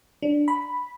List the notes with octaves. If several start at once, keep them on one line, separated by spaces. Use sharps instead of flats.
D4
B5